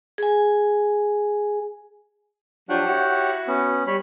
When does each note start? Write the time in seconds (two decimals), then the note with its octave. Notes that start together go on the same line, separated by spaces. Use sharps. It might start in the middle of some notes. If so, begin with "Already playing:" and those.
0.18 G#4 G#5
2.69 F3 F#3 D4 G4 C#5 F#5
2.87 E4 F#4
3.47 B3 C#4
3.87 G3 C#5 B5